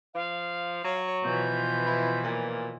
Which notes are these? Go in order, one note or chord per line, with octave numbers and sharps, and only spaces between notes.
F3 F5
F#3 C#5
B2 E3 F3 G6
E4
A#2